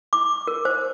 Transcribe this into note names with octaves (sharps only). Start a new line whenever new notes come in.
D6
A#4
C5